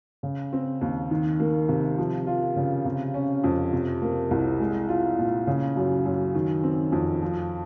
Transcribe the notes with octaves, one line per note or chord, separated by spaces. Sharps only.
C#3
C4
D#2
D#3
A#3
C3
F3
F4
C#3
C3
C#4
F2
C3
A#3
C2
G#3
F4
A#2
C#3
F#2
F#2
D#3
C4
F2
F3